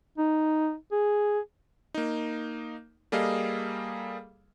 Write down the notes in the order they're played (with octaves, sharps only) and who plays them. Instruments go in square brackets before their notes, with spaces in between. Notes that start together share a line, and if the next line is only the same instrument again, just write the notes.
[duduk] D#4
G#4
[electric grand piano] A#3 D#4
G3 A#3 G#4 A4 D#5 F5